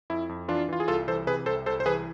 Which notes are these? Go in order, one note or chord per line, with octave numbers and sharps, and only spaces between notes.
F2 E4
F2
E3 D4 F4
E3 F4
G#4
C2 F4 A4
E3 A4 C5
C3 G#4 B4
C2 A4 C5
C2 A4 C5
C5
E3 G#4 B4